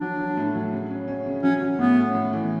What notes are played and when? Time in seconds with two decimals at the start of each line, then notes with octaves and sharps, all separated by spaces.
0.01 F#3 D4
0.18 F#3
0.37 A2
0.55 F#3
0.73 C#3
0.91 C#4
1.08 C#4
1.26 C#3
1.43 F#3 C#4
1.61 F#3
1.79 A2 B3
1.97 C#4
2.15 A2
2.33 E3